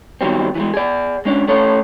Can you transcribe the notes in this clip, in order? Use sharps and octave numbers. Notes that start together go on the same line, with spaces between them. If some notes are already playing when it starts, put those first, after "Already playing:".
B2 D#3 F#3 G3 C4
E3 F#3 G#3
G#4 D5
G#3 C#4 D4
A3 C#4 A4 C#5